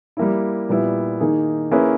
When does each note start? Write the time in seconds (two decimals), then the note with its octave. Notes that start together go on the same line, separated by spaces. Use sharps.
0.17 G3 A#3 E4
0.69 A#2 G3 B3 E4
1.20 D#3 A#3 D#4 G#4
1.71 A#3 C#4 E4 G#4 B4